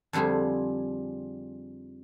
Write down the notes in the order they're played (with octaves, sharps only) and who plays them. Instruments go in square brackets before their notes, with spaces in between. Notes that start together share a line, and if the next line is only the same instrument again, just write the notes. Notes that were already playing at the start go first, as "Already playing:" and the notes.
[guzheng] F2 D3 G3 C4 G#4